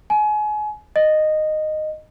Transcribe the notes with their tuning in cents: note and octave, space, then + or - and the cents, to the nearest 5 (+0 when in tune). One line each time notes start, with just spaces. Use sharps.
G#5 +30
D#5 -10